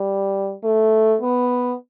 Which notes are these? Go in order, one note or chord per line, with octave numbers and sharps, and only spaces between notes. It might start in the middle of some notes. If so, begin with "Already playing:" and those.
Already playing: G3
A3
B3